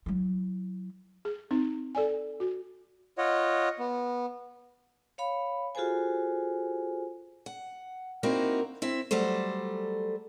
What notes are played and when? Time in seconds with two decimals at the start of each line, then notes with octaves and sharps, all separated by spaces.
0.06 F#3 E4
1.25 G#4
1.51 C4 D#4
1.95 A4 D5 G#5
2.40 F#4
3.18 F4 C#5 D#5 F#5
3.79 B3
5.18 C#5 F5 B5
5.75 F4 F#4 G#4 A4 C5 G#5
7.46 F#5
8.23 A#3 C4 D#4 E4 F#4 A#4
8.82 C4 E4 E5
9.11 F#3 G3 A3 A4 C5